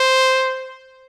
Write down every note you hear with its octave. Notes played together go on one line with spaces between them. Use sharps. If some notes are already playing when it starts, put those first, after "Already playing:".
Already playing: C5